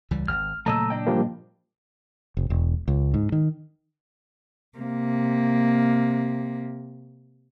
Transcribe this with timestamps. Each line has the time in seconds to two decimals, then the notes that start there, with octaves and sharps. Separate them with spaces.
0.11 C#2 E3 G3
0.28 G#1 F6
0.66 A#2 C#3 F#3 A3 D#5 A#5 E6
0.90 D4 D#5 G5
1.07 F3 G3 A#3
2.37 F1
2.50 E1
2.88 C#2
3.14 G#2
3.32 D#3
4.78 C3 A#3